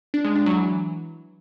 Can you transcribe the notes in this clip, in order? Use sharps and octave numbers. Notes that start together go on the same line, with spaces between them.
D4
G#3
D4
F#3
E3